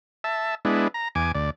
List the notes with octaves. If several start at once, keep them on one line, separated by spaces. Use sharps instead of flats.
E5 A5
G#3 B3 D4 E4
A#5
E2 G#5 D6
D2 D5